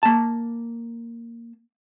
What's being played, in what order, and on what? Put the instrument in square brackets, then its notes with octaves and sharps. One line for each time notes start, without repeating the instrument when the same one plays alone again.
[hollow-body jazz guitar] A#3 A5